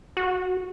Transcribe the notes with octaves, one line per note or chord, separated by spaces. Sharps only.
F#4